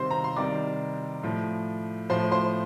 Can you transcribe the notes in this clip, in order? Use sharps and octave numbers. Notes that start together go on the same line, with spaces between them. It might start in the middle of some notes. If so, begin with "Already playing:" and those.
Already playing: C3 D#3 G3 C5 C6
A#5
C6
C3 D#3 G3 D5 D6
A2 F3
A2 F3 C5 C6
C5 C6